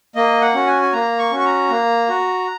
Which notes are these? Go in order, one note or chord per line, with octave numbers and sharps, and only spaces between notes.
A#3 D#5
F#5
C#4 F#4
G#5
G#5
A#3 A#5
C#6
C#4 F#4
C#6
A#5
A#3
F#4